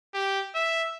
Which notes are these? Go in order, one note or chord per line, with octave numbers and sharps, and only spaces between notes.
G4
E5